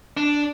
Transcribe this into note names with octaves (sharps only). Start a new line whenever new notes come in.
D4